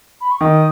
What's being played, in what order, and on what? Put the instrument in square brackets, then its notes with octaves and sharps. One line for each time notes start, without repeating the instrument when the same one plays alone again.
[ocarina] B5
C#6
[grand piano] D#3 [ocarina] D#6